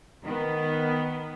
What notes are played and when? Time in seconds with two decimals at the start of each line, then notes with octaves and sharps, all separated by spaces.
0.23 D#3 B3